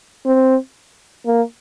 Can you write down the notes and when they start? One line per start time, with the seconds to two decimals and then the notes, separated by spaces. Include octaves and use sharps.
0.26 C4
1.26 A#3